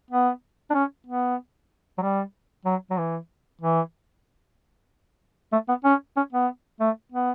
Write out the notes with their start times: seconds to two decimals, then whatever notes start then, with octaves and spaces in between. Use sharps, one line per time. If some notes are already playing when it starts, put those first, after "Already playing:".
0.10 B3
0.70 D4
0.74 C#4
1.07 B3
1.98 F#3
2.02 G3
2.66 F#3
2.90 F#3
2.98 E3
3.61 E3
5.52 A3
5.68 B3
5.84 C#4
6.17 C#4
6.32 B3
6.80 A3
7.12 B3